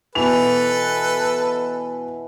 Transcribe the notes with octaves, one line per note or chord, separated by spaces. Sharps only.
B2 E3 A4 B4 F7